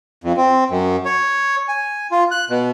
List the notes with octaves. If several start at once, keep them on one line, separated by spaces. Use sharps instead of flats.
F2
C4
F#2
C#5
G#5
F4
F#6
B2